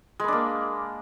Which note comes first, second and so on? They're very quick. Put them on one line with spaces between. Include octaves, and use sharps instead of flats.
G#3 B4 D4 A#3